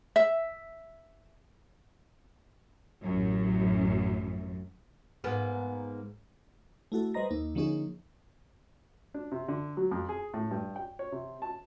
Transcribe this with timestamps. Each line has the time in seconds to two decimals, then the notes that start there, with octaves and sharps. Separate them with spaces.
0.16 E5
3.04 A1 F#2
5.24 G#2 A#3 B3
6.92 A3 E4 F#4 A4
7.14 G3 B4 C5 D#5 A#5 A#6
7.31 D#2 A#3 D#4
7.55 D3 F3 A#3 C#4 D#4 G#4
9.14 D4
9.32 C3
9.48 D3
9.77 F#3
9.91 F2
10.09 G#4
10.34 A2
10.51 G2
10.76 G5
10.99 C#5
11.12 C3
11.42 A5